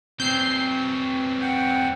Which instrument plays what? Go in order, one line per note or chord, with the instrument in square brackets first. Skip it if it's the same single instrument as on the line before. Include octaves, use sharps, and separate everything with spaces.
[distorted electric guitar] E2 F#3 [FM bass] C4 [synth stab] G6 C7
[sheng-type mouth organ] F#5 G5